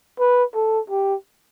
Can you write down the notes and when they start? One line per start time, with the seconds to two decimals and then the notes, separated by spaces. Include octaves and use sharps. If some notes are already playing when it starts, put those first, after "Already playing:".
0.19 B4
0.55 A4
0.90 G4